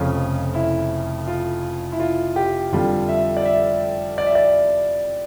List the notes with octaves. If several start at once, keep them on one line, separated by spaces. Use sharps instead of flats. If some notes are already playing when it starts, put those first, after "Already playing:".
Already playing: F1 F2 C#3 F3 C#4 F4
E4
F4
E4
F4
G4
F2 D3 G3 F4
E5
D5
E5
D5
E5
D5